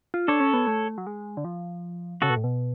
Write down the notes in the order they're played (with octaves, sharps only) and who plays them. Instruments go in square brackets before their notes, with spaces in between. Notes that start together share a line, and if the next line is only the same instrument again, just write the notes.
[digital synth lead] F4
[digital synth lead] D4 [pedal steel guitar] A4 C#5
[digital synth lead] C#4
B3
A3
F#3
G#3
D3
F3
[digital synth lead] C#3 [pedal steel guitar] F#4 A4
[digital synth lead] B2
A2
B2